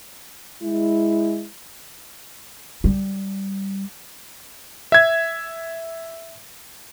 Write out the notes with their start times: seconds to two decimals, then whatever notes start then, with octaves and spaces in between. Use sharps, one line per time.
0.62 G#3 E4
2.84 G3
4.92 E5 G#6